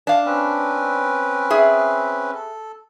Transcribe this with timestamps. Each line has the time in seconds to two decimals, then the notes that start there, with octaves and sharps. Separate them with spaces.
0.07 D4 F5
0.26 C4 C#4 B4
1.50 G#4 E5
2.34 A4